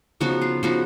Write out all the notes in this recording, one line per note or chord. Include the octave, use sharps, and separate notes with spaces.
C#3 F3 B3 D#4 F#4
F4
C#3 F3 B3 D#4 F#4